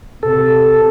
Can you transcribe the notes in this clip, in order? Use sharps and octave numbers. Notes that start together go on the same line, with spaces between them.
C3 A4